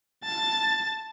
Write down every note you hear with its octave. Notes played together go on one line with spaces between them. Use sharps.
A5 A6